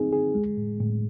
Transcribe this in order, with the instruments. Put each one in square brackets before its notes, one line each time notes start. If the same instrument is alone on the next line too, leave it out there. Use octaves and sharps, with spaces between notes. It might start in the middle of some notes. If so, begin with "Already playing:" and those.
Already playing: [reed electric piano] C4 D#4 G#4
G#4
G#3
A2
A2